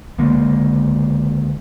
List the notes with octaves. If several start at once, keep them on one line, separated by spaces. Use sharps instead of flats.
C#2 D3 G#3 A#3